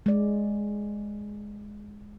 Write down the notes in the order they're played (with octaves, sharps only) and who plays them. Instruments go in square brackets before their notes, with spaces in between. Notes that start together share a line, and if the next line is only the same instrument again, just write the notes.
[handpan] G#3 D5